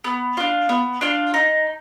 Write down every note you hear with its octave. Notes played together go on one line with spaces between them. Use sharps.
B3
D4 F4
B3
D4 F4
D#4